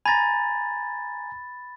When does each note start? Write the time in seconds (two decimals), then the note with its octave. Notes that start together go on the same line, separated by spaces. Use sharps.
0.06 G#5 A#5 B5 A6